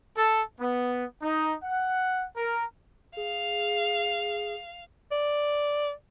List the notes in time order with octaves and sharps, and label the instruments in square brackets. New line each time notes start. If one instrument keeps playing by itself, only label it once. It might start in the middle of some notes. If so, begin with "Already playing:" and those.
[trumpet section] A4
B3
D#4
F#5
A#4
[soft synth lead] G#4 [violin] F5
[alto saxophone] D5